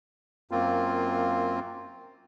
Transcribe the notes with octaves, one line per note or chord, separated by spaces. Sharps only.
F#2 A#3 C4 F4